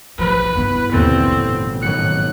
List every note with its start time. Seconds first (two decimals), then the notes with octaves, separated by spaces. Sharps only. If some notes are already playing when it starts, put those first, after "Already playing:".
0.19 A#1 F3 B4
0.55 G2 B3 E4
0.92 G1 D#2 B2 C4 A6
1.22 A1
1.82 G#1 F#3 F#6 C#7